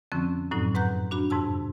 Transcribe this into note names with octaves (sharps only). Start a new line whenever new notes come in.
F2 D3 F3 C4 C#4 E6
F#2 A2 D3 F#3 C4 D#4
G#2 B4 F#5 A#5 F#6 G6
D4 F#4 B5
F2 G#2 C3 A5 E6